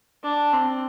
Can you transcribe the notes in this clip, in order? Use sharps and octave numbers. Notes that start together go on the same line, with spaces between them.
D4
C4